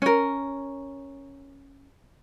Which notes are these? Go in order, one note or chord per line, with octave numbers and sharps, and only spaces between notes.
C#4 A#4